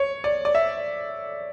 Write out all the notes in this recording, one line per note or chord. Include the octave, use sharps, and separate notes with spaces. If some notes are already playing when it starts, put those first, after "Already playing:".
Already playing: C#5
D5
D5
E5